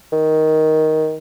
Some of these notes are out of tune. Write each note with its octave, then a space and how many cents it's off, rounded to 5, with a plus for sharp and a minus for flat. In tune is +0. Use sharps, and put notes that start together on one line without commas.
D#3 +10